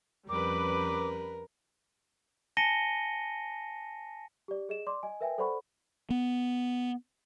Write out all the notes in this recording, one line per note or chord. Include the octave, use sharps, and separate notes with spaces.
F2 G3 C#4 A#4 B4 D6
G#5 A5 A#6 C#7 D#7 G7
G4 D5
G#4 D#5 E7
D5 C6 D6
D#5 G#5
A#4 B4 E5 G5 G#5
A4 C5 D5 F#5 B5 C#6
B3